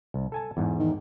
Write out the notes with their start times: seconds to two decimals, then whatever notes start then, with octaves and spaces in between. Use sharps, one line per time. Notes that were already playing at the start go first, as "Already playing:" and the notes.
0.14 C2
0.32 A4 G#5 A5
0.57 E2 G#2
0.79 D#3